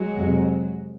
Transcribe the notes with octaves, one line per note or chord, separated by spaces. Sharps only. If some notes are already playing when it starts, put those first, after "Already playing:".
Already playing: F#3 G#3
F2 C3